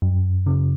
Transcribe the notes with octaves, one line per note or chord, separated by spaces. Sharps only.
F#2
C#3